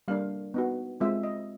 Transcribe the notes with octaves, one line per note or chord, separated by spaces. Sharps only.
G3 A#3 D4 F5
B3 D#4 F#4
G#3 C4 F4 E5
D#5